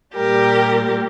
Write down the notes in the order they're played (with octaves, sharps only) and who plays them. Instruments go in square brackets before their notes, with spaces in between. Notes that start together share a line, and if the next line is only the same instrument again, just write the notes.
[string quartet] A#2 G3 G4 A#4